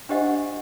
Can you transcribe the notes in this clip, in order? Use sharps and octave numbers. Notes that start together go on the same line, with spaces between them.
D4 G4 C5 D#5 F#5